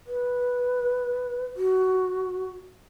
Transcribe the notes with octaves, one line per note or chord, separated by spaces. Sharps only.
B4
F#4